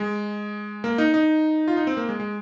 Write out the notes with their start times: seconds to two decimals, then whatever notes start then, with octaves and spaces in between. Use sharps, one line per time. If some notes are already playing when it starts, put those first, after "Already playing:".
Already playing: G#3
0.84 A#3
0.98 D#4
1.14 D#4
1.68 F4
1.77 D#4
1.87 C4
1.97 A#3
2.09 G#3
2.20 G#3